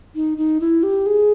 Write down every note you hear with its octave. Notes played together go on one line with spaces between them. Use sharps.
D#4
D#4
E4
G4
G#4